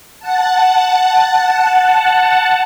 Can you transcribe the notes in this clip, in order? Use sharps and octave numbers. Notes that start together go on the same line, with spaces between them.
F#5 A5